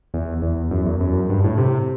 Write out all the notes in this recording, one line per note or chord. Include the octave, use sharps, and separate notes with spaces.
E2
E2
F#2
E2
F#2
G2
A2
C3